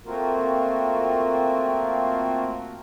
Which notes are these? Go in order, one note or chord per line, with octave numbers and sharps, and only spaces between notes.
A3 A#3 C4 F4 F#4 A#4